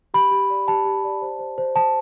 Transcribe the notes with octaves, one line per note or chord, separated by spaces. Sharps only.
G4 B5
G4
D5
G4 A5
G4
D5
C5
C5
C5
C5 A5